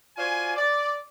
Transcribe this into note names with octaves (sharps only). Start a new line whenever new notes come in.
F4 F#4 C5 D5 G#5
D5